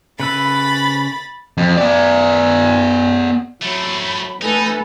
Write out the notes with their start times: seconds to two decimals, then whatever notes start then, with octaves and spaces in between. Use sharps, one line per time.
0.20 C#3 B4 B5 E6 A6
1.57 F2
1.77 B3 D5
3.62 F#3 A3 C4 B5
4.42 A3 D#4 A4 B4 G#5